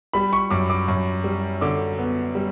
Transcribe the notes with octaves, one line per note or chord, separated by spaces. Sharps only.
G3 B5
C#6
F#2 D6
D6
F#2
G3
D3 D6
B3
G3